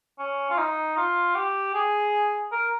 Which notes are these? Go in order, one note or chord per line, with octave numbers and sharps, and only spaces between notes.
C#4
F4
D#4
F4
G4
G#4
A#4